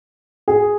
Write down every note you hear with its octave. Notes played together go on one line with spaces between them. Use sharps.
G#4